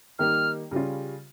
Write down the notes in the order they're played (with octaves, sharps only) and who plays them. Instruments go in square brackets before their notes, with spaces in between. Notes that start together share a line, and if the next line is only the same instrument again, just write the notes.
[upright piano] D#3 G3 A#3 D#4 G4 [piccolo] F6
[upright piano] C#3 G3 C#4 F4